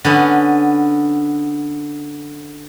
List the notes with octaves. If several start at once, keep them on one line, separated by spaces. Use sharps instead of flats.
D3 B3 C#4